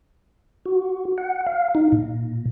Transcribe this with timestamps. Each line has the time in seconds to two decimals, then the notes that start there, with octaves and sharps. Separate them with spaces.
0.65 F#4
1.18 F#5
1.47 F5
1.75 D#4
1.92 A#2